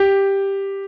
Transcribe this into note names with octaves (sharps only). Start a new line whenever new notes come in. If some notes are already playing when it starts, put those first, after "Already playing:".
Already playing: G4